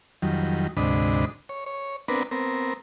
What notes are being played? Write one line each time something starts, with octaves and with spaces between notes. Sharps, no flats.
F2 D#3 F#3 G3
D2 G#2 C3 D4 D#5 B5
C#5
C#5
B3 C4 D4 A#4 B4
B3 C4 A#4